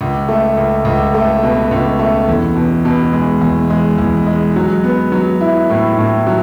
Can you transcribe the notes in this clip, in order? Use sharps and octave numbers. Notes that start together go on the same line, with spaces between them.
C#2
A3
C#2
C#2
A3
B2
C#2
A3
E2
B2
B2
G#3
E2
G#3
E2
G#3
F#3
B3
F#3
E4
A2
A2
F#3